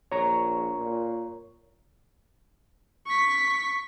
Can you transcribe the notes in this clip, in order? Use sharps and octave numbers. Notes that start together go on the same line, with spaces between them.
A#1 C#5 A#5 C#6
A#2
C#6 B6